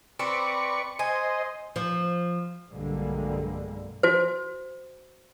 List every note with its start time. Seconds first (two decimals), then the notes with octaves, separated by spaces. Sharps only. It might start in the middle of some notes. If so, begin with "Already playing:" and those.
0.19 C4 B4 D5 C#6
0.99 C5 D#5 G#5
1.76 F3
2.69 B1 G2 D3 G3 G#3 A#3
4.03 F#4 C5